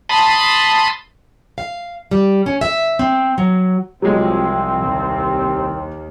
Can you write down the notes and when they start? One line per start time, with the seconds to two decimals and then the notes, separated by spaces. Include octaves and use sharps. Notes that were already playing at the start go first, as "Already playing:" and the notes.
0.09 A5 B5 C6 D#6
1.58 F5
2.11 G3
2.46 C#4
2.61 E5
2.99 C4
3.38 F#3
4.02 C2 F3 F#3 G#3 C4
4.81 D#2